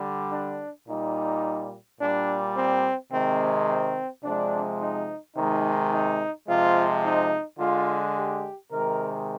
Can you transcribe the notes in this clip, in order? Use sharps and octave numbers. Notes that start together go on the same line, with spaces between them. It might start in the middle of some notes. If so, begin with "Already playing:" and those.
Already playing: D3 G3
D4
A#2 G3 D#4
A#2 G3 D4
C4
C3 D#3 G#3 C4
C4
C3 F3 G#3 D4
D#4
C3 D#3 G#3 D#4
D#4
C3 F3 G#3 F4
D#4
D3 G#3 F4
G4
C3 D#3 G#3 A#4